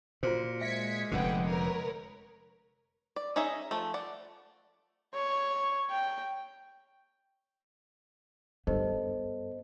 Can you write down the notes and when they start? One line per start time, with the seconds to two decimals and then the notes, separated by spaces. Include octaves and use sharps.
0.23 A#2 F4 F#4 C5
0.61 G#3 E5 G#6 B6 C#7
1.12 F1 F2 D3 B3 F#5 G5
1.45 A#4 B4 C#5
3.16 D5
3.36 C#4 D#4 G#4 D#5 E5
3.71 F3 A3
3.94 D5 F#5
5.14 C#5
5.90 G5
8.67 G2 B3 A4 C5 D#5